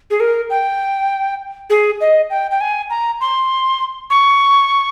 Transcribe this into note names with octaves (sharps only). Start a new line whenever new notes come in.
G#4
A#4
G5
G#4
D#5
G5
G5
G#5
A#5
C6
C#6